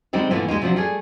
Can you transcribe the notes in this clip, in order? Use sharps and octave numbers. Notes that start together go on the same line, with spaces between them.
D3 G3 G#3 C4 D#4
G2 A#2 D3 E3 A3 B3
G3 G#3 A#3 D#4
C3 F3 F#3 C4 D4
G3 A3 G#4